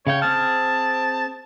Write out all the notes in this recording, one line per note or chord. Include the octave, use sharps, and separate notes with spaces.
C#3 C#5 F5 G5
C4 G#4 A5 F6